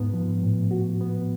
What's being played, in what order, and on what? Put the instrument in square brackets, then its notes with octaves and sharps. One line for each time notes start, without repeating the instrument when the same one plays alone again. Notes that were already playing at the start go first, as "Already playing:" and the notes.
Already playing: [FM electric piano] G#2 [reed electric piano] B3
[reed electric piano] F3
A2
F#4
B3